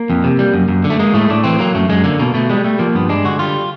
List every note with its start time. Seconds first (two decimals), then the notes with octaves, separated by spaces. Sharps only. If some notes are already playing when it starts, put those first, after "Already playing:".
Already playing: A#3
0.10 F2
0.24 C3
0.39 G3
0.54 F#2
0.69 F#2
0.84 D3
0.90 A3
0.99 G#3 A#3
1.14 A2 A3
1.30 A2 D4
1.44 E3 C4
1.59 F#3 A#3
1.75 F#2 A3
1.89 F#2 G#3
2.04 D3 A#3
2.19 B2 A#3
2.34 B2 A3
2.50 G3 G#3
2.64 G3 A3
2.79 F3 A#3
2.95 G2 B3
3.09 G#3 D4
3.24 D3 F#4
3.39 G3 F4